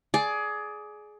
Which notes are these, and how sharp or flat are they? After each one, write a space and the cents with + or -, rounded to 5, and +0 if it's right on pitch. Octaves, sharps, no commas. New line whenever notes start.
G#4 +20 D5 +0